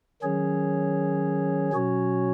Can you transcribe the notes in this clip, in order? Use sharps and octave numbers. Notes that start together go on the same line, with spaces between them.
D#3 F#3 C#4 G#4 C#5
B2 F#3 C#4 F#4 C#5